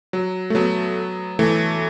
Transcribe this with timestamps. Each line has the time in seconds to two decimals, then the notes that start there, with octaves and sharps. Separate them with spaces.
0.13 F#3
0.50 A3
0.55 F#3 B3
1.39 E3 A3